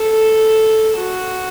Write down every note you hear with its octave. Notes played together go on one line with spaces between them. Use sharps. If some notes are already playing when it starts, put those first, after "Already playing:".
Already playing: A4
F#4